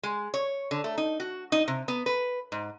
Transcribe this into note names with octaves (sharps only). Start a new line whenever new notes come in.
G#3
C#5
D3
A3
D#4
F#4
D#4
C3
B3
B4
G#2